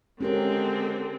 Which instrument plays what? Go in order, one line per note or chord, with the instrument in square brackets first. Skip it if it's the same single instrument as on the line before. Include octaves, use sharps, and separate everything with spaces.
[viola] D3 C4 [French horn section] G#3 [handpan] C#4 G4 A#4